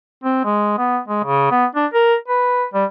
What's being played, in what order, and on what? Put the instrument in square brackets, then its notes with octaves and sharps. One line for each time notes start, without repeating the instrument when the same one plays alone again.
[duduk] C4
G#3
B3
G#3
C#3
B3
D4
A#4
B4
G3